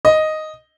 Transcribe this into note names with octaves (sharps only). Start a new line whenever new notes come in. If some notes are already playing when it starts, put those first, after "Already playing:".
D#5